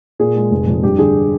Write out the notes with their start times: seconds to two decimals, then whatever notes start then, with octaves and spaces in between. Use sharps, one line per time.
0.19 A#2 G#4
0.36 G#3
0.51 F1
0.67 F2
0.83 G2 G4
0.99 D3 G#4